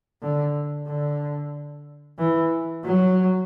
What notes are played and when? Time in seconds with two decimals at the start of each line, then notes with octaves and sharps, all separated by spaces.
0.22 D3
0.87 D3
2.19 E3
2.85 F#3